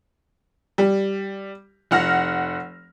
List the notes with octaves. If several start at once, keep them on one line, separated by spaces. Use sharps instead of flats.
G3
F1 F#5 F6 A#6